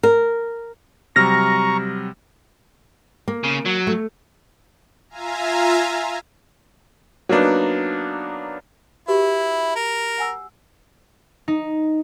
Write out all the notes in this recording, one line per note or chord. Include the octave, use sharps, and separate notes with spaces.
A#4
C3 F#3 G3 A#5 C#6 F6 A#6
A#3
C#3
F#3
A3
F4 E5 F5 G#5 A#5
F#3 A#3 B3 D4 D#4
E4 F#4 G4 B4
A#4
F#5 G#5 E6
D#4